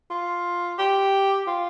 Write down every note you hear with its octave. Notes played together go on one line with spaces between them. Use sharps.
F4
G4
F4